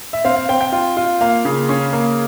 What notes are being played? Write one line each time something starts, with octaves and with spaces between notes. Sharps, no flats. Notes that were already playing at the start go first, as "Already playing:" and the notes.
E5
C4 F5
F5
C4 G5
G5
F4
F4
A#3 F5
C#3
C#4
A#3